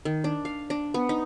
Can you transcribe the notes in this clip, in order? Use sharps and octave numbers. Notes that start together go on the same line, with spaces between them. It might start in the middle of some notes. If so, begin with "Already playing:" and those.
D#3
D4
F5
D4
B3
D#4